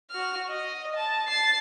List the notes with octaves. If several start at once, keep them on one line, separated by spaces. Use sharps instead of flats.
F#4 F6
D#5
A5
A6 C7